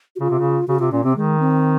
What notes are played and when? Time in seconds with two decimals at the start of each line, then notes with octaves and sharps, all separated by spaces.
0.16 F#4
0.20 C#3 F4
0.30 C3
0.39 C#3
0.68 C#3 F#4
0.79 C3 F4
0.92 A#2 C#4
1.04 C3 C4
1.15 D#3 G#3
1.40 C4